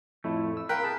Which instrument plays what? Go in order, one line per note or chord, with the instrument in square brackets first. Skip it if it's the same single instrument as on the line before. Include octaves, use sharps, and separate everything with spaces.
[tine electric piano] F2 A2 E4 [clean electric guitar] A3
[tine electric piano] E6
[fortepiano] A#4 G5 [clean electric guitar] B4 [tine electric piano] F5 F#6
[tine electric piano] G#4 A5